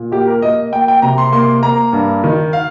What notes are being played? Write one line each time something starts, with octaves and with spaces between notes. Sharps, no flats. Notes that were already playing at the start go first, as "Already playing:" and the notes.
Already playing: A#2
A#3 G4
A#4
A#3 D#5
A#3 G5
G5
C3 A#5
C6
A#3 C6
A#3 A#5
G2
D#3
F5